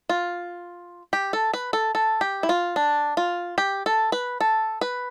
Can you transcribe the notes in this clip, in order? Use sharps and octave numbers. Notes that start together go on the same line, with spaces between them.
F4
G4
A4
B4
A4
A4
G4
E4
F4
D4
F4
G4
A4
B4
A4
B4